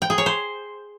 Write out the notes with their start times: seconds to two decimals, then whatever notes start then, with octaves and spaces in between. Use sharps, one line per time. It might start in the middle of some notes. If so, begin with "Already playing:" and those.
0.02 G5
0.10 G#4
0.18 C#5
0.26 C5